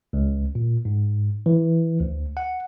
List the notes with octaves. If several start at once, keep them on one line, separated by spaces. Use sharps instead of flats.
C#2
A#2
G#2
E3
D2
F#5